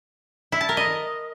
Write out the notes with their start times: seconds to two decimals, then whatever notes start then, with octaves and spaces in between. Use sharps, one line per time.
0.52 E4
0.61 A5
0.69 A#4
0.77 D#5